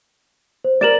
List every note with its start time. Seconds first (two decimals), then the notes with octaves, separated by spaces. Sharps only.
0.65 C5
0.81 A#4 D5 A6 E7 F#7